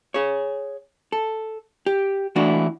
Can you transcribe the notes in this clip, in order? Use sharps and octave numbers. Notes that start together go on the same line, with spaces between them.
G#4 C#5
A4
G4
E3 A3 D4 E4 F#4